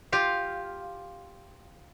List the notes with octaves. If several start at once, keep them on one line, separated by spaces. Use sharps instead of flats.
F4 G4 F5